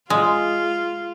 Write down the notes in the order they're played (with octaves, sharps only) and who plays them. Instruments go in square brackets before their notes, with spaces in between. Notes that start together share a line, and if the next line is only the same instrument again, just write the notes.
[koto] G#3 [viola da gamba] F4